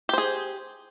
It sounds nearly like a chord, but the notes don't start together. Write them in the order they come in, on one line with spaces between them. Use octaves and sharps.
G4 C5 G#4